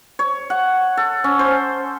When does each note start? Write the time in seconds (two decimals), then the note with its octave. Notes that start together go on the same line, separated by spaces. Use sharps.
0.19 C#5
0.50 F#5
0.97 A4
1.24 C#4
1.39 C5